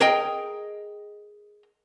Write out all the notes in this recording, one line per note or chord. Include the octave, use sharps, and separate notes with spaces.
G#4 A#4 D#5 G5